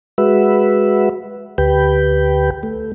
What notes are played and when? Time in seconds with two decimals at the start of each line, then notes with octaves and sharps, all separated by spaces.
0.18 G#3 F#4 B4 E5
1.58 D2 G4 B4 G5
2.63 A3